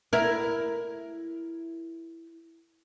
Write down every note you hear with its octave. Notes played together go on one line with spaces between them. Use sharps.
E4 A#4